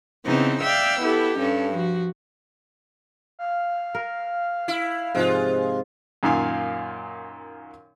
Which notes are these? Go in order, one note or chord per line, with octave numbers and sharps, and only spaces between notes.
C#3 E3 B3 C4 D#4
D5 E5 F5 G5 E6
B3 E4 G4 A4
G2 C#4 A4
F3 F#4
F5
A#4
E4
G#2 C3 F3 G#3 F4
F#2 A#2 D#3 F5 G#5